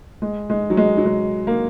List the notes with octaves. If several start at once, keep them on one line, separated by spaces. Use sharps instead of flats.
G#3
G#3
F#3
G#3
F#3
G#3
A#3